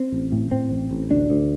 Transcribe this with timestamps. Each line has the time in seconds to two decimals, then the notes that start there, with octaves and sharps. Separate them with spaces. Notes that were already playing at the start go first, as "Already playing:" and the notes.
Already playing: C4
0.12 A1
0.32 A2
0.51 A2 C4
0.71 A1
0.91 A1
1.10 D2 D4
1.30 D2